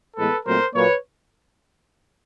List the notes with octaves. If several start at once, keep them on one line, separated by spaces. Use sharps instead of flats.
A2 E3 G#3 B3 A4 B4
A#2 F#3 A3 C4 A#4 C5
A#2 F#3 A#3 B4 C#5